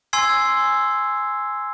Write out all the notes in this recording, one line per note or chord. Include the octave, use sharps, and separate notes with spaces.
G#5 C6 E6 G#6 C7